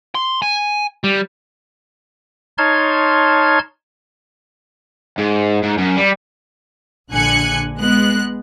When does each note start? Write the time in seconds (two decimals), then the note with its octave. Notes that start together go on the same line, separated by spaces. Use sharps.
0.15 C6
0.42 G#5
1.04 G3
2.58 D#4 C#5 A5 C6 F6 G#6
5.18 G#2
5.63 G#2
5.78 F#2
5.96 G3
7.11 A#1 D3 G#5 F#6 C#7
7.80 G#3 B3 F#6